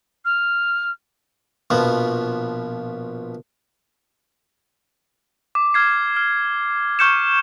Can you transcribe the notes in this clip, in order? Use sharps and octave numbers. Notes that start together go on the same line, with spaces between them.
F6
A#1 B2 F3 B3
D6
F6 G#6 C7
F6
C#6 F6 G6 C#7 E7